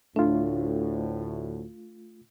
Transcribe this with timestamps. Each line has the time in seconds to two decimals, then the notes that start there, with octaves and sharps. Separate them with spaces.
0.16 D2 A2 A3 D4 F4